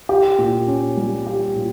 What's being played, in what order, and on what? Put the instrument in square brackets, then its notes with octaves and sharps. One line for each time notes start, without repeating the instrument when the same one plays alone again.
[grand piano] G4
A#2
C#4
G3
G4
A#2